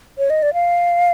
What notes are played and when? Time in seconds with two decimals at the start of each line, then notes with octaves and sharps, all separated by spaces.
0.18 C#5
0.30 D#5
0.42 D5
0.54 F5